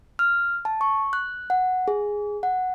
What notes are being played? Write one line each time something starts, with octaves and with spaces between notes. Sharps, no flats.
F6
A5
C#6
F#6
F#5
G#4
F#5